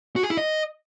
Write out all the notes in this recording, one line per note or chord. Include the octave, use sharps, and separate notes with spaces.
F#4
G#4
E4
D#5